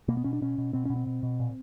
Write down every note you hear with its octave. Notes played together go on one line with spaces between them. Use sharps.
B2 A#3
B3
B2 C#4
D4
B2 C#4
B2
B2 C4
B2 C#4
C4
B2
B2
A#2